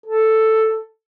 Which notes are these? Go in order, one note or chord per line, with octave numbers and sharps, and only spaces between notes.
A4